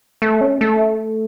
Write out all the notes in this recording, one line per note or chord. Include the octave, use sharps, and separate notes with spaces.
A3
C#4
A3